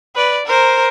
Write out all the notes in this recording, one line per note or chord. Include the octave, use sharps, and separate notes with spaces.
B4 D5
A#4 C5